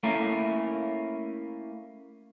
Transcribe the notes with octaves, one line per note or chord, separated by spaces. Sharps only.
A3 A#3 C#4 E4 A#4